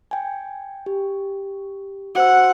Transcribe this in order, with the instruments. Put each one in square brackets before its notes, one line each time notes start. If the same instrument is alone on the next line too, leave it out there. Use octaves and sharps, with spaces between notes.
[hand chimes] G5 G#5
G4
[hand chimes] F#4 C5 E6 [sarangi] F#5